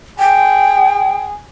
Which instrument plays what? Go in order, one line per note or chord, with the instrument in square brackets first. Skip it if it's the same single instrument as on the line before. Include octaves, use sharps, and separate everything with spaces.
[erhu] G#4 [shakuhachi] G5